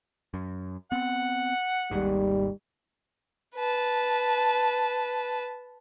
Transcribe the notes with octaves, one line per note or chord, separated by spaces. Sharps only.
F#2
B3 C4 F#5
G#1 D#2 G#2 G3
B4 A5